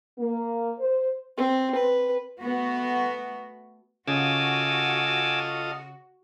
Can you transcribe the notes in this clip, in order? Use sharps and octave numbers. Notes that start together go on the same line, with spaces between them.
A#3
C5
C4
B4
A3 B3 F#4
C#3 F4 F#4 A4 D#5 G#5 D6 E6